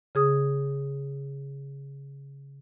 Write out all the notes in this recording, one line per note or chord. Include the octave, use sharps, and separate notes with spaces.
C#3 G#4 D#6